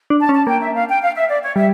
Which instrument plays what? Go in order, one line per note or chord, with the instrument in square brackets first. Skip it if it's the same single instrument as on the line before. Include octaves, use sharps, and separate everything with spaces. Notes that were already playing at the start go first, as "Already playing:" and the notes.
[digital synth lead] D4
[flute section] A5
[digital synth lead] C#4
[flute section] A5
[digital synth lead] A#3 [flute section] G5
[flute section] E5
F5
G5
F5
E5
D5
C#5
[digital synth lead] G3 [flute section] E5